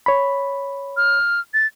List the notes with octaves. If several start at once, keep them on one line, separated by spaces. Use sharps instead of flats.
C#5 B5
F6
A6